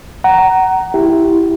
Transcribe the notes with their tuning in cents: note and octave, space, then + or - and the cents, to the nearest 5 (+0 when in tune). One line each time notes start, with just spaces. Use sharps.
F#5 +25 A#5 +0
E4 +0 G4 +0